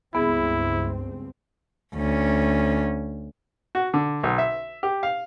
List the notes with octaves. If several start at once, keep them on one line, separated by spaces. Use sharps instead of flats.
C#2 G2 B3 C4 E4 G#4
D2 C#4
F#4
D3
B1
E5
G4
F5